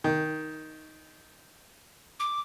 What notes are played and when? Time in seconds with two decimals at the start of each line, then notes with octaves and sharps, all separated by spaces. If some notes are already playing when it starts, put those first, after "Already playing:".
0.04 D#3
2.20 D6